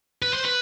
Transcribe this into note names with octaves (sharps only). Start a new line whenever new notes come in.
B4
C5
B4